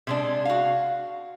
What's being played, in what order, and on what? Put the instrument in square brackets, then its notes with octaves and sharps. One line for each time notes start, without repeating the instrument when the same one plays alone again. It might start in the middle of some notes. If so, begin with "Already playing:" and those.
[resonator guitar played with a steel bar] C3 G#3 D4
F#4 F5